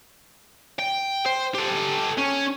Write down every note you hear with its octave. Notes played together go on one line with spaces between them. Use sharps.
G5
C5
G4 A4
C#4